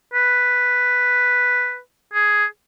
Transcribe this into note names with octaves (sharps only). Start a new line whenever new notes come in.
B4
G#4